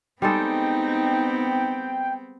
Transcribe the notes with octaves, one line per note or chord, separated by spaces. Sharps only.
G3 G#3 B3 C4 D#4 A4 G5